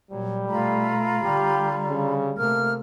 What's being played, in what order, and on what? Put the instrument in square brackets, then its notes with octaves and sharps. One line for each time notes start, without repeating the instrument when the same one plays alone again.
[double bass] A#2 F#3 [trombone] G3
[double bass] B2 A3 [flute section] F4 A#5 B5
[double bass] D3 G3 [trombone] G4
[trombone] C#3
[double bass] C3 A3 [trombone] A#3 [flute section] F6